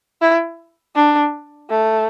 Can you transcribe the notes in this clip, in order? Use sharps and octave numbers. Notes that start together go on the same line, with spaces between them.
E4
D4
A3